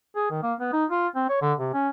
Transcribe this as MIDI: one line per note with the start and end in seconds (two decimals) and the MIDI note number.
0.15 0.27 68
0.31 0.43 51
0.43 0.54 58
0.60 0.70 59
0.73 0.85 63
0.91 1.08 65
1.16 1.25 60
1.29 1.40 73
1.42 1.53 50
1.60 1.74 48
1.74 1.89 61